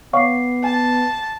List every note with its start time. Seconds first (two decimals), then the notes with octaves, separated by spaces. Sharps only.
0.13 B3 C#5 F5 F#5 C#6 D6 C7
0.64 G#5 A5